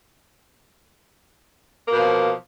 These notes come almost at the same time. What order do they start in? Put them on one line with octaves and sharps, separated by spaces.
A#3 B2 F3